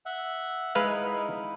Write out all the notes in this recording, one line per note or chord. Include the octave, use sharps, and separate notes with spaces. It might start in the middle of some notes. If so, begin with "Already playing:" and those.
E5 F#5
G#3 D#4 E4 B4 F5